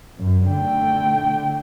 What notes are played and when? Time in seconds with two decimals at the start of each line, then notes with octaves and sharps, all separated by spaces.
0.18 F#2
0.48 D3 A3 G5